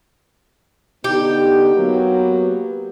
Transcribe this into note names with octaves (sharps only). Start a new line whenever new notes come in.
D3 B3 D#4 G4
F#3 A#3 B3